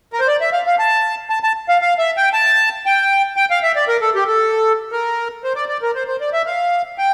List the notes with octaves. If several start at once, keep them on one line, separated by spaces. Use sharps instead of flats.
A#4
C5
D5
E5
F5
F5
A5
A5
A5
F5
F5
E5
G5
A5
G5
G5
F5
E5
D5
A#4
A4
G4
A4
A#4
C5
D5
D5
A#4
C5
C5
D5
E5
F5
G5